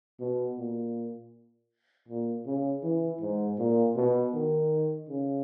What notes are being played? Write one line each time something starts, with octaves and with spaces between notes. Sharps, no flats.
B2
A#2
A#2
C#3
E3
G#2
A#2
B2
D#3
C#3